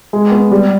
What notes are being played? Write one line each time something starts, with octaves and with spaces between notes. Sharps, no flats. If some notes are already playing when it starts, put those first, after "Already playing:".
G#3
B3
G3